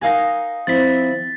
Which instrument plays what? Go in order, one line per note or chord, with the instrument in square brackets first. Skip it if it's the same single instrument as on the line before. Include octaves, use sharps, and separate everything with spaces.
[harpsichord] D#4 F5 G#5 [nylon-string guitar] A#4 F#5
[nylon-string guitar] F3 E4 [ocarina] C4 [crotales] A6 B6